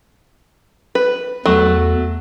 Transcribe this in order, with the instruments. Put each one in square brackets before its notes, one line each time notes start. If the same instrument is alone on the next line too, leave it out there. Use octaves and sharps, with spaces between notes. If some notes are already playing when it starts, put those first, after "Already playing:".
[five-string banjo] B4
[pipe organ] E2 [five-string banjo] F#3 A3